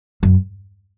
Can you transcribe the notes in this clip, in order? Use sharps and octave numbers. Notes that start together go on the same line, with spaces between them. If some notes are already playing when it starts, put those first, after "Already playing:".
F#2